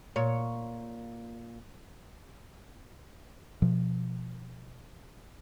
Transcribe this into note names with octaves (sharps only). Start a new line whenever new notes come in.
A#2 C#5
B2 F3